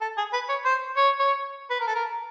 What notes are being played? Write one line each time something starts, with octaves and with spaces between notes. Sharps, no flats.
A4
G#4
B4
C#5
C5
C#5
C#5
B4
A#4
A4
A#4